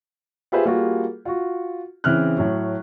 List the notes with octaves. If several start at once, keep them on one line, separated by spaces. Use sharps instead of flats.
F4 G4 G#4 B4 C5 E5
G3 A#3 F4 F#4 G#4
F4 F#4
C#3 E3 C4 F6 F#6
A2 F#3